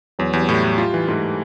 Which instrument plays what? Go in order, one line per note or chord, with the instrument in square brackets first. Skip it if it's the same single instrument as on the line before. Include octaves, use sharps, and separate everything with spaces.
[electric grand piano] E2 [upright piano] F#3
[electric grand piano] E2 [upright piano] G3
[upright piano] F#3
[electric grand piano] A2 [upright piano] G3
[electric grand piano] A2
[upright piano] G3 [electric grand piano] F4
[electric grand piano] E3
[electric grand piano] G#2 [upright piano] A3